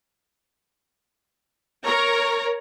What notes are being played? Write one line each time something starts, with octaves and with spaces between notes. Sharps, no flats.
A#4 C#5 A#5